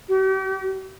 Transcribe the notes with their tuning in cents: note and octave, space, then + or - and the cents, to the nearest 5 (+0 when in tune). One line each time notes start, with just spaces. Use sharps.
G4 -40